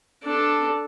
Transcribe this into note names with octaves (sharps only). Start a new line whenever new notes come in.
D4 A4